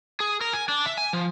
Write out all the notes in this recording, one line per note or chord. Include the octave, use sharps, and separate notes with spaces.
G#4
A#4
G#5
D4
E5
G#5
F3